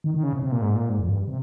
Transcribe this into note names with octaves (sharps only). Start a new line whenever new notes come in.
D#3
D#3
C#3
C3
C3
A#2
G#2
A#2
G#2
F2
G2
C3